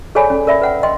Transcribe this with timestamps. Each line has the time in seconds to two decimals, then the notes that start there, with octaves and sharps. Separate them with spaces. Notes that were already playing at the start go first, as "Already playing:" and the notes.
0.15 G#4 A4 C#5 D5 G#5 B5
0.30 C#4
0.47 A#4 D5 E5 B5
0.62 B4 F#5 G5
0.83 D#5 G5 C6